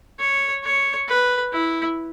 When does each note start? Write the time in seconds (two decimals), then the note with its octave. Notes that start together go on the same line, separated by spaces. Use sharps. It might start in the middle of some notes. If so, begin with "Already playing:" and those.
0.20 C#5
0.64 C#5
1.08 B4
1.53 E4